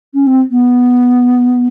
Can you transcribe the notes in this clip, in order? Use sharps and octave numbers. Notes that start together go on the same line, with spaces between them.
C#4
C4
B3